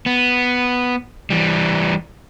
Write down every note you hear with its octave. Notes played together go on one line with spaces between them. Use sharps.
B3
E3 G3